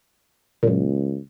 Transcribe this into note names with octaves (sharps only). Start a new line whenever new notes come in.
C#2 F#2 A#2